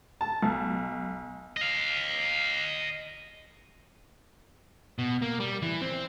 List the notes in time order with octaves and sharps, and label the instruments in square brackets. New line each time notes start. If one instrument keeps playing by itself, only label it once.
[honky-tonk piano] A5
B1
[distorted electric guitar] D#5 F5
[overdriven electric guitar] B2
A#3
G3
E3
C4